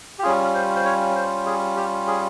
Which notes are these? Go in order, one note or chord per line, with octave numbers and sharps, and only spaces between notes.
G4
G3 C#4 F4 G#4
C5
C5
C#5
C5
G#4
G4
G#4